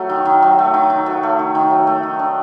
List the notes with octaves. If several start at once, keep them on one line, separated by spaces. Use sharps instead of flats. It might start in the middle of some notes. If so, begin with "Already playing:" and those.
Already playing: F#3 A3
D#3
D#3
F#3
A3
D#3
D#3
F#3
A3
D#3
D#3
F#3
A3
D#3
D4